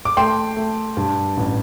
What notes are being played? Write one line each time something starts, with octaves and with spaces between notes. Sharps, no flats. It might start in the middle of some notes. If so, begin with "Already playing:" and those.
D6
A3 G5 C6
A3
G2
A1